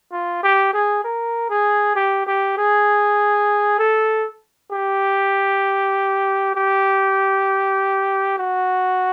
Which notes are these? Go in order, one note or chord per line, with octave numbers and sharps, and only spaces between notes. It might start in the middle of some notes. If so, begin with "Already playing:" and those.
F4
G4
G#4
A#4
G#4
G4
G4
G#4
A4
G4
G4
F#4